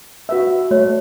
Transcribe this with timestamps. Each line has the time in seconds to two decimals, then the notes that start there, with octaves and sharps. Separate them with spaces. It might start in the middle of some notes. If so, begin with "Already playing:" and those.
0.29 F#4 B4 E5
0.71 A3 C#5